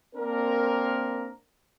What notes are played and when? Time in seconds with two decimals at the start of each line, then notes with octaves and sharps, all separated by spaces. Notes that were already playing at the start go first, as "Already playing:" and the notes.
0.15 A#3 C4 D4 A#4